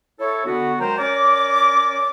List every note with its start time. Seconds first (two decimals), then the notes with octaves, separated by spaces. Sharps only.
0.20 E4 A4 C#5
0.46 D3 B3 F#4
0.80 F#3 G#3 A#4 C5 G5 A#5
0.98 C#4 A#4 C#5 D5 D6